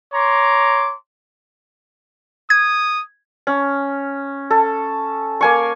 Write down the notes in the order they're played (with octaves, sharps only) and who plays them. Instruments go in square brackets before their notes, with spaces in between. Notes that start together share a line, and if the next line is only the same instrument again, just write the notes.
[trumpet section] C#5 A#5 C6 D6
[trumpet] D#6 [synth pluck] G#6
[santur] C#4
A4
A#3 G#5 C#6